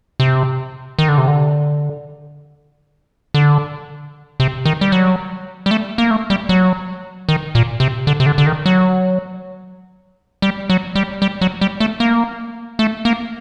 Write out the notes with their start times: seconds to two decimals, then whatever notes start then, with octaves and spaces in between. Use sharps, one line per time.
0.20 C3
0.99 D#3
1.08 D3
1.18 C3
1.28 D3
3.34 D3
4.40 C3
4.65 D#3
4.81 G3
4.92 F#3
5.66 G3
5.71 A3
5.98 A#3
6.11 A3
6.30 G3
6.49 F#3
7.29 D#3
7.55 A#2
7.80 C3
8.07 D3
8.20 C3
8.26 D3
8.38 D3
8.47 D#3
8.66 F#3
10.42 G3
10.70 F#3
10.95 G3
11.22 G3
11.41 F#3
11.61 G3
11.80 A3
12.00 A#3
12.79 A3
13.05 A#3